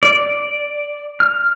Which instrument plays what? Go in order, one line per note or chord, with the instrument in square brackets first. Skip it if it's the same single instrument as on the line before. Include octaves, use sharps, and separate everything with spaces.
[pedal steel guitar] D5
F6